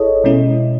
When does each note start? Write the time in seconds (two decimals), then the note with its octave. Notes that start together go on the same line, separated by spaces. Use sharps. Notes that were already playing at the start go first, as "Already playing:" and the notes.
Already playing: G#1 E4 G#4 A4 C#5 D#5
0.24 B2 G#3 C#4 E4